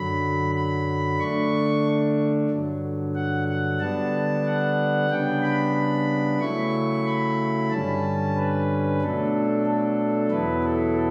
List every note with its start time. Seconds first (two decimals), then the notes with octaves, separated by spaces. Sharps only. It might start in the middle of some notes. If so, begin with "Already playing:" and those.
Already playing: F#2 D3 F#3 B5
0.55 B5
1.19 D3 A3 D4 C#6
2.50 G2 D3 F#3
3.15 F#5
3.48 F#5
3.80 D3 G3 B3 D4 A5
4.46 F#5
5.10 C#3 G3 B3 D4 G5
5.43 B5
6.40 C#3 F#3 A3 E4 C#6
7.06 B5
7.70 G2 D3 G3 C#4 A5
8.36 B4
9.01 B2 F#3 A3 D4 A4
9.66 A4
10.31 E2 B2 F#3 B3 E4 B4
10.63 A4